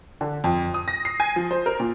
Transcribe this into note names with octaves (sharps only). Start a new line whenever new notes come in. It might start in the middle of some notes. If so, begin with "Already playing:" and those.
D3
F2
D#6
A#6
C7
G#5
F3
C5
A#4
A#2